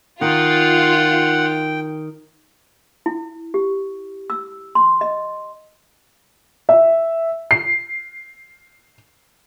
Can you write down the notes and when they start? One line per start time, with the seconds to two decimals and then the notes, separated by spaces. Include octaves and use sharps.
0.21 D#3 F4 F#5 G5
3.06 E4
3.54 G4
4.30 E6
4.75 C6
5.01 D#5
6.69 E5
7.51 C7